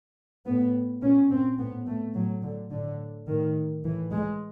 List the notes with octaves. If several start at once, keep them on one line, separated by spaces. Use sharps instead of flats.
A2 B3
A#2 C#4
C4
A2 B3
A3
A2 F#3
D3
A2 D3
A2 D#3
A2 E3
G#3